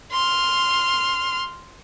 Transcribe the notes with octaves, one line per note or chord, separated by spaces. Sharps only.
C6 F6